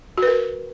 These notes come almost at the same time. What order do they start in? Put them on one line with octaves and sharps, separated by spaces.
F#4 B4 A#4